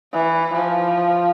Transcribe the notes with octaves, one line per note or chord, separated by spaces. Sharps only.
E3
F3